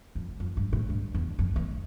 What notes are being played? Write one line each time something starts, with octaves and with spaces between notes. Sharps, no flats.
F2
F2
G2
A2
G2
E2
F2
E2